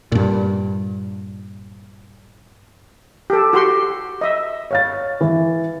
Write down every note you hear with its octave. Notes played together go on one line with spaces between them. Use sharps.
G2 A#2
G4 A4
F#4 G4 C6
D#5 E5
C#5 F5 A6
E3